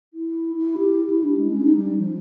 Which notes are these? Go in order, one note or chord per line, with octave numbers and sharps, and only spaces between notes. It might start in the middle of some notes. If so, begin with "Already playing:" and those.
E4
E4
G4
E4
D4
G#3
C#4
D#4
G3
F3